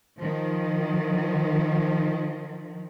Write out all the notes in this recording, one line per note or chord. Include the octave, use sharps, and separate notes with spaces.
D#3 F3